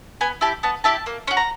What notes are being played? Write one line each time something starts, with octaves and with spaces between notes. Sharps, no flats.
B3 G#5
E4 G4 A5
B3 A5
E4 G4 A5
A#3
C#4 F#4
A#5